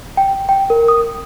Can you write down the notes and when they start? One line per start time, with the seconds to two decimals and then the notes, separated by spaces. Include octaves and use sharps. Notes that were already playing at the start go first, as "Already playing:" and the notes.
0.17 G5
0.49 G5
0.70 A#4
0.88 D#6